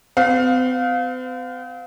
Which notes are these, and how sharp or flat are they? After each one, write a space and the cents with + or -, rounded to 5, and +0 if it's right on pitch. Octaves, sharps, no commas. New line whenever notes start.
C4 -45 F5 +20